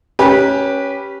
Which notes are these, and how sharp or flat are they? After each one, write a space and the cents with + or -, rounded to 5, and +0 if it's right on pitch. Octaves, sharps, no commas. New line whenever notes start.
C#4 +0 G4 +0 B4 -20